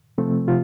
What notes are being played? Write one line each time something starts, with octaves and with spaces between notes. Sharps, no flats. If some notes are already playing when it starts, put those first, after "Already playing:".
C3 F3 A3 C4
C3 F3 F4